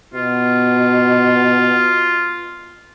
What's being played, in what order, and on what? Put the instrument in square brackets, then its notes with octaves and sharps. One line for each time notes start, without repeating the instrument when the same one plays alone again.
[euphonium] B2 [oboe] F4